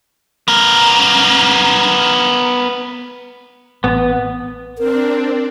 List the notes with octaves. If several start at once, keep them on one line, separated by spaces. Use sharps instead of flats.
B3 A#4
A1 B3
C4 D4 A#4